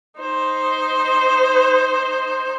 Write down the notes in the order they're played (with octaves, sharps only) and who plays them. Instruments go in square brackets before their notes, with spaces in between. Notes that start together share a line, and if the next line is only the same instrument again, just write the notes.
[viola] D#4 C5